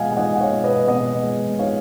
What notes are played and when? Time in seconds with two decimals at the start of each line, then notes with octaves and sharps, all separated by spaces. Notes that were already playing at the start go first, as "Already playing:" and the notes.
Already playing: B2 G#3 D#5 F5 F#5 G#5
0.12 G#5
0.16 D#4 D#5 F#5
0.35 F#5
0.40 C#5 F5
0.52 B2
0.64 B4 D#5
0.88 B2 D#5 F#5
1.23 G#3
1.59 D#4 C#5 F5